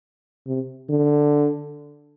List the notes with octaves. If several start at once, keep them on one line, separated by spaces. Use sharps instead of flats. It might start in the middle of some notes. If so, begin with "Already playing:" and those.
C3
D3